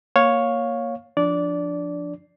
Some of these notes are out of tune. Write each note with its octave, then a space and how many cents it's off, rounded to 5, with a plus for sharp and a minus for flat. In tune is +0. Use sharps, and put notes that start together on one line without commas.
A#3 +0 C#5 +0 F5 +15
F3 +0 D4 +0 D5 -15